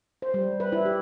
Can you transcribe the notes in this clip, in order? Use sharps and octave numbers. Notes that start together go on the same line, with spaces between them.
C5
G3
B4
E4
G4